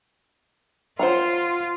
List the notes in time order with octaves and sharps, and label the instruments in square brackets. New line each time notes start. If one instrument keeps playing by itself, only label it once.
[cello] F4 [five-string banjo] C5 F#5 A#5